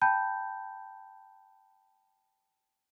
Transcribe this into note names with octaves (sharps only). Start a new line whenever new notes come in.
G5 A5 B5 G6